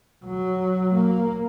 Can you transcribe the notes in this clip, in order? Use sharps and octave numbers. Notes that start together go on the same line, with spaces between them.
F#3
A#3